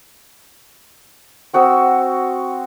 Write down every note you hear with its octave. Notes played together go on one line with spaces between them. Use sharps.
C4 F#4 D#6 E6